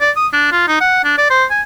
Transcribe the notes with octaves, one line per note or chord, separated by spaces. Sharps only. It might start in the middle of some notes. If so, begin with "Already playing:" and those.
D5
D#6
D4
F4
D#4
F#5
D4
D5
C5
G#5